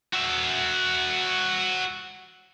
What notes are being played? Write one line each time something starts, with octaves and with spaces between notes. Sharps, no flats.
F#4 E5